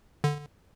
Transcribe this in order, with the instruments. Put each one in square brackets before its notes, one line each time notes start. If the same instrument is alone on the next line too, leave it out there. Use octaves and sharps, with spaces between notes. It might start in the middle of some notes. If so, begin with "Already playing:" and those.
[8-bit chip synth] D3